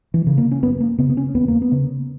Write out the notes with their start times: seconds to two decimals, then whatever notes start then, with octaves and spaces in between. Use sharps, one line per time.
0.14 E3
0.27 C#3
0.38 A#3
0.51 C#4
0.63 F#2 B3
0.80 A#3
0.99 C#3 B3
1.10 B3
1.17 C#4
1.34 E2 B3
1.48 A#3
1.62 B3
1.72 C#3